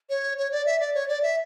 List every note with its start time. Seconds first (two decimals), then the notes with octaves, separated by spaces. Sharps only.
0.10 C#5
0.38 C#5
0.52 D5
0.66 E5
0.80 D5
0.94 C#5
1.08 D5
1.23 E5